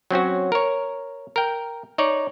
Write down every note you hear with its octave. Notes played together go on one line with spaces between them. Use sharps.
F#3 C4 C#4 F#4
A#4 C#5
A#4 G5
D#4 C#5 D5